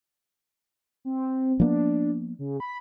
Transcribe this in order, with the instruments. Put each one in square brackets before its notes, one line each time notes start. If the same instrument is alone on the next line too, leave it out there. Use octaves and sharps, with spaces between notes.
[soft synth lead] C4
[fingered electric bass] F3 A#3 B3 [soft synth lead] D4
[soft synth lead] C#3
B5